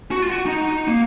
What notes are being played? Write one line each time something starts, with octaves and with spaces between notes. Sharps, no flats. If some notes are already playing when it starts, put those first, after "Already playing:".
F#4
F4
F#4
D#4
A#3